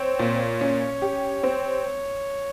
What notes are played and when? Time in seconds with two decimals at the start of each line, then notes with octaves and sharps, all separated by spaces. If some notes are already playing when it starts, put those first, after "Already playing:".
Already playing: C4 C#5
0.19 A#2
0.61 C#4
1.02 G4
1.43 C4